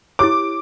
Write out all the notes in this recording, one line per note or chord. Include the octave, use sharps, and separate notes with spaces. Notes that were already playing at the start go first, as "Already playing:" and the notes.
E4 G4 C#5 D6